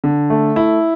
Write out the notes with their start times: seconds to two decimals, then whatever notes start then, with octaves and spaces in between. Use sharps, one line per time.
0.04 D3
0.30 A3
0.56 E4